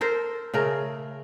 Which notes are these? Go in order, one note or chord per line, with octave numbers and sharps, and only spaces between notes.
A4 A#4 C5
C#3 A3 A#4